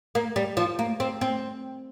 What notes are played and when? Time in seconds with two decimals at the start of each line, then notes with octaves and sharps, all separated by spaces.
0.15 A#3
0.36 G3
0.57 F3
0.79 A#3
1.00 C4
1.21 C4